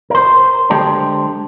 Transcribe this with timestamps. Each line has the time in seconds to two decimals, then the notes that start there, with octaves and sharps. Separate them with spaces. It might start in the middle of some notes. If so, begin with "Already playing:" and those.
0.10 A#4 C5
0.70 D3 G#3 G4 C5 A5